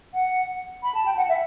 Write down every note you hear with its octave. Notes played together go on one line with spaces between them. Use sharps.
F#5
B5
A5
G5
F#5
E5